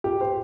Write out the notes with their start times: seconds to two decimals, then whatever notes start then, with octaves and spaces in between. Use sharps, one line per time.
0.04 G4
0.21 C5